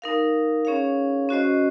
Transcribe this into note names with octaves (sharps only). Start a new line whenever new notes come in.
D#4 A#4 F5
C#4 G#4 C#5 F5
C#4 F#4 C5 D#5